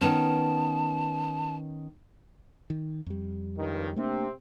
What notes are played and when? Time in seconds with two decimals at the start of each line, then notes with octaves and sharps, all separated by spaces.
0.01 D#3 B3 C#4 A5
2.70 D#3
3.06 F2 G3
3.57 C#2 G2 D#3
3.96 C3 A3 A#3 C4 D4